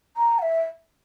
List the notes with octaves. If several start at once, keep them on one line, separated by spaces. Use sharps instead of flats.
A#5
F#5
E5